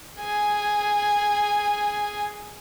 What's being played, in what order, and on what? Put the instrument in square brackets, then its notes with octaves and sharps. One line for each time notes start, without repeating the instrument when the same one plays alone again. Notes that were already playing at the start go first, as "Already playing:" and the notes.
[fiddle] G#4 G#5